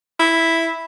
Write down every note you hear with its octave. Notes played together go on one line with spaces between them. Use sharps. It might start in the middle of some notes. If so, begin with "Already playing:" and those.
E4